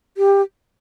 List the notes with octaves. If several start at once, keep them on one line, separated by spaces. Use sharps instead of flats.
G4